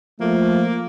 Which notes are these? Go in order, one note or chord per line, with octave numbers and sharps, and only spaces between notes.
F3 A3 A#3